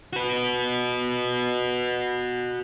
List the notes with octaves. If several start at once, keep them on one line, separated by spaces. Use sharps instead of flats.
F#4 B4